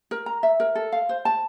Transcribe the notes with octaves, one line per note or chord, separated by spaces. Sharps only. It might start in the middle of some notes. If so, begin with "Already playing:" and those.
A#4
A#5
E5
A#4
A4
F5
C5
A5